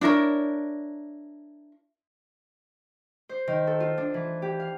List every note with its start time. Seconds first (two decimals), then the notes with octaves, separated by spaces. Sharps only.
0.01 D4 E4 A#4 C#5
3.29 C5
3.48 D#3
3.67 A4
3.80 F4
3.98 D4
4.14 E3
4.42 G4
4.60 F5